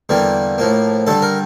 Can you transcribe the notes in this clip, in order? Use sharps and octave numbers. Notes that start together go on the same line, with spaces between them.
E2 D3 G3 A#3
A2 F3 A#3
G2 D3 G3 A4
A#4